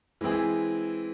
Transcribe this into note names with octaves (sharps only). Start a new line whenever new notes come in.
E3 G#3 C4 E4 G#4